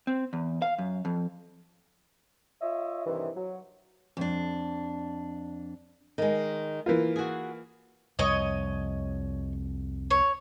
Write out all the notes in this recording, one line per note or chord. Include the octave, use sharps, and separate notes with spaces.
C4
E2
F5
F#2
F2
F4 C#5 D#5 E5
G2 C3 D#3 E3
F#3
F2 D4
D#3 G#3
E3 A#3 F4
F#4 G#4
C2 F2 C#5 D#5
C#5